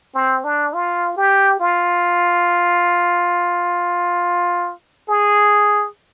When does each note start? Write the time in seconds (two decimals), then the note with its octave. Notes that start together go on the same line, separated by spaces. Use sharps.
0.14 C4
0.44 D4
0.73 F4
1.17 G4
1.60 F4
5.09 G#4